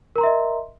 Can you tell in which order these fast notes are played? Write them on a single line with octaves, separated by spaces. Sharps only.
A#4 A#5 C6 E5 D#5